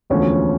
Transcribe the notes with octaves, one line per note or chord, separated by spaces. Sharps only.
E1 D2 D3 F3 C#4